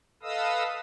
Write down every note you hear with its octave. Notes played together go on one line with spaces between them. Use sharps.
A4 B4 D#5 F5 D#6 E6